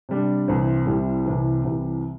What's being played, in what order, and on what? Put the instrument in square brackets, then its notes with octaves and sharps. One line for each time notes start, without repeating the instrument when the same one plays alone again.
[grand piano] C3 G3 D4
C2 C3 E3 C4
C2 C3 G3 C4 E4
C2 C3 E3
C2 C3 E3